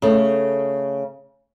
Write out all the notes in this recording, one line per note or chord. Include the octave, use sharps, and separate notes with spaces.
C#3 A3